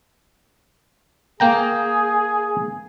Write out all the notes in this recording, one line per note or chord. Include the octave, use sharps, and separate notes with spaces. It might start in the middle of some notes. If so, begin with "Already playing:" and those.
A#3 G#4 G5 A#5